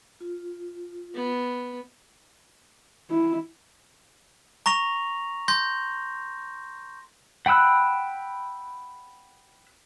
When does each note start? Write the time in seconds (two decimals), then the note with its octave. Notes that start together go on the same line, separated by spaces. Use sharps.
0.20 F4
1.14 B3
3.11 E4
4.66 A#5 C#6 A#6 F7
5.48 C6 G6 A#6
7.46 F#5 G5 B5 E6 F#6